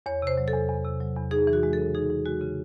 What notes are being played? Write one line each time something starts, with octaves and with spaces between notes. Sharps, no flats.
E2 C#5
C3 C5
F#3
A4
E2
E2
C3
F#3
E2
D#4 G#4
E3
F#4
G#3
A4
C#3
D#4 G#4
E3
G#3 F#4
C#3